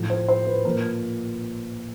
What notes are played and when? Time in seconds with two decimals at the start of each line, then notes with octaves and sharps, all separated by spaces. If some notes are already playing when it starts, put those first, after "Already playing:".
Already playing: A2 F3
0.10 C5
0.28 C5
0.47 B4
0.65 A#2 F3 A#4